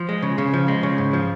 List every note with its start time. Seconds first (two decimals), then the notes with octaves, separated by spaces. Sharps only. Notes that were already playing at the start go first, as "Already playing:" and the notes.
Already playing: F3
0.09 G#3
0.23 C#3
0.38 C#3
0.53 F3
0.68 G#3
0.83 C#3
0.98 G#2
1.13 F3